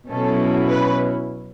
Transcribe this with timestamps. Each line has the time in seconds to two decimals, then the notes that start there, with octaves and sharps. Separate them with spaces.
0.10 B2 F#3 C#4 E4 A4
0.70 B4